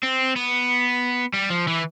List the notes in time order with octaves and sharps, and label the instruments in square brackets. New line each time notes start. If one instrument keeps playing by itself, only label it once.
[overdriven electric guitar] C4
B3
G3
F3
E3